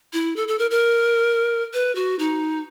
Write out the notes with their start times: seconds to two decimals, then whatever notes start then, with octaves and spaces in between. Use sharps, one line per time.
0.13 E4
0.36 A4
0.48 A4
0.59 A#4
0.71 A#4
1.73 B4
1.95 F#4
2.19 D#4